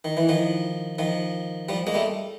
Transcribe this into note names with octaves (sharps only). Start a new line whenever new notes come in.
D#3
E3
D#3 F3
D#3 F3
F3 G3
G#3 A#3
G3 A3